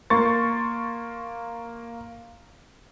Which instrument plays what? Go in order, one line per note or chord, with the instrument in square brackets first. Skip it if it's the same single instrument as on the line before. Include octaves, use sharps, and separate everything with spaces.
[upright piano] A#3 C6 C#6 A6